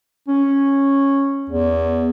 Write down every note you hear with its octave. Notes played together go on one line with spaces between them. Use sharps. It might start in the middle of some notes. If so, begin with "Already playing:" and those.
C#4
E2